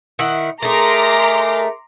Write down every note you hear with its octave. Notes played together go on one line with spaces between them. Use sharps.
D#3 E4 F#5
A3 D#4 G#4 A#4 A#5 C6 D6